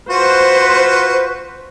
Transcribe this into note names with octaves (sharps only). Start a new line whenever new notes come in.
F4 F#4 B4 C5